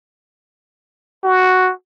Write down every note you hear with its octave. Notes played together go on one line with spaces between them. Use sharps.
F#4